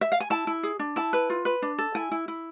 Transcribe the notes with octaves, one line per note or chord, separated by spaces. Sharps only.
E5
F5
G#5
E4 A5
E4
G#4
D4
E4 A5
B4
F4
B4
D4
A4
E4 G#5
E4
E4